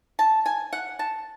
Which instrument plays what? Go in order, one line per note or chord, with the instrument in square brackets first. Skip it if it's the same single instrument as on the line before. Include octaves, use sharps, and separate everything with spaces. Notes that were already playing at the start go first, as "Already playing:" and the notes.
[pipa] A5
G#5
F#5
A5